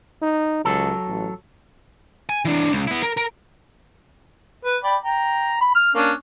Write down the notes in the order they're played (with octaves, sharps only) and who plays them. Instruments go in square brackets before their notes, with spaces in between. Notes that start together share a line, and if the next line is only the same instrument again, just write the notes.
[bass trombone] D#4
[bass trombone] C#2 [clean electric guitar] F#3 A4
[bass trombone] A1
[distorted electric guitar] G#5
E3 D4
C#2
B3 E4
A#4
A#4
[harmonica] B4
D5 G5 B5
G5 A#5
B5
F6
A#3 C#4 D4